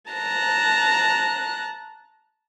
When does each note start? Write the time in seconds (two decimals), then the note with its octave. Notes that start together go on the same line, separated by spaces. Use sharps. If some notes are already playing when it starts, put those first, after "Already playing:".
0.11 A5 A#5 F#6